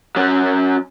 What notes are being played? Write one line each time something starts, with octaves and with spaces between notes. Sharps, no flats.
F#3 C#4